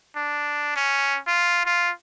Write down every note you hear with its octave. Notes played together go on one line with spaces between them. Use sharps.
D4
C#4
F4
F4